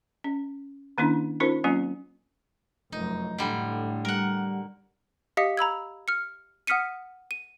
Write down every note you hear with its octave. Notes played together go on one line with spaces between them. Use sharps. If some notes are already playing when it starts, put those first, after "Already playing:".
C#4
D#3 A#3 C#4 D4 E4
C#4 D#4 F4 A#4 C5
F#3 A#3 C4 C#4 F4
F1 F#2 D#4
A2 D3 G3
G3 A#4 F#5
G4 D#5 F5 D#6 B6 C#7
A#5 B5 E6 G#6
F6 C#7
F#5 D#6 F6 B6 C#7 D#7
D#7